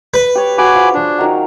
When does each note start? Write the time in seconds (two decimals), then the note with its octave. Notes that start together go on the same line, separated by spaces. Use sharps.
0.14 B4
0.35 G4 C#5
0.58 F#4 G#4 G#5 B5 D6
0.75 F3
0.94 D4
1.18 D#3 F#3